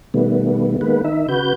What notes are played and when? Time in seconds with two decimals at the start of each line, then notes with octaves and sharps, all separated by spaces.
0.14 B2 D#3 G3 A3 B3
0.81 D#3 G#3 A#3 B3 B4
1.04 D#3 D#4 E5
1.28 C#3 F#4 B4 G6